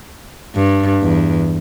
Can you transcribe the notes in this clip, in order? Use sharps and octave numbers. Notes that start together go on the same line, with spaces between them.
G2
E2